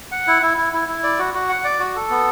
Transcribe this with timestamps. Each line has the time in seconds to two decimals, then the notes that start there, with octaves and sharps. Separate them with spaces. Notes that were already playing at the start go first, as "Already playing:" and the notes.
0.12 F#5
0.27 E4
0.42 E4
0.57 E4
0.73 E4
0.88 E4
1.03 D5
1.19 F#4
1.34 F#4
1.49 F#5
1.64 D5
1.79 F#4
1.96 A4
2.10 B3